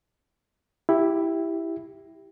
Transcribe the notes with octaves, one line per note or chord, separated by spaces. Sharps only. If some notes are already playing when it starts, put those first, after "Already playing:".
E4 G4